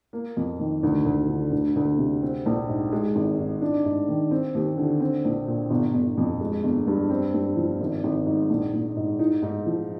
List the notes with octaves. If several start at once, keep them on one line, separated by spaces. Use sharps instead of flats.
A#3
F2
D#3
D2
D2
D3
D2
D2
C3
C4
A#1
G#2
G#3
G#1
G#2
D4
G#2
D#3
C4
D#2
D3
C4
A#1
A#2
G1
G1
F2
G#3
G1
G2
C4
G2
F3
G#1
G#1
G#2
A#1
A#1
G#2
D#4
G#2
F3